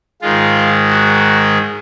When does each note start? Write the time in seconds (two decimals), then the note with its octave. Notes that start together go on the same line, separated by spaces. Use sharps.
0.22 G#2 D#3 G#3 F4
0.90 F#4